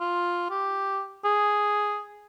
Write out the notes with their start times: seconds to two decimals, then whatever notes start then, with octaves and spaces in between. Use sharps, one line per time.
0.01 F4
0.51 G4
1.25 G#4